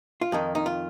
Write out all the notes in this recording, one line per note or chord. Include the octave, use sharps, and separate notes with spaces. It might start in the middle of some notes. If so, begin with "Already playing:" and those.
F4
F2 D#3 D#4
D#4
F4